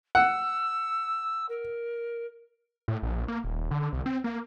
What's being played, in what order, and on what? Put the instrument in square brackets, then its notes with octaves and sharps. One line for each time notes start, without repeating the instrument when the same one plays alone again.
[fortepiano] F#5 [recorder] E6
[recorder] A#4
[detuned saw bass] A2
A#1
A#1
A#3
D#1
D3
C2
C4
A#3